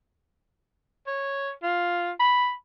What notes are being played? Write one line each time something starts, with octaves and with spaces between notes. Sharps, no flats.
C#5
F4
B5